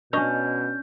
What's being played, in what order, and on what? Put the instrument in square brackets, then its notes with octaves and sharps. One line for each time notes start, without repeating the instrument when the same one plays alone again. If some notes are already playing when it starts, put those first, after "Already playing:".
[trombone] B2 [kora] C#4 D4 [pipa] C#5 D#5 [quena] G6